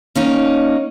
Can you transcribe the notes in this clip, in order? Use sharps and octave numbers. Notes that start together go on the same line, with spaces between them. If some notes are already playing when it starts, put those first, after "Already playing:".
A#3 C#4 D#4